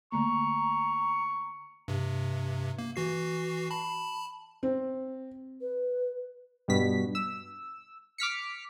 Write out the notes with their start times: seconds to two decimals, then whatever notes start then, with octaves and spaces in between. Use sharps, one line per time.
0.12 D3 A3 A#3 A#5 C#6
1.88 G2 C3
2.78 A#3
2.96 E3 F#4 C7
3.71 A5 B5
4.63 C4
5.60 B4
6.68 G2 B2 B6
7.15 E6
8.18 D6 F6 B6 C#7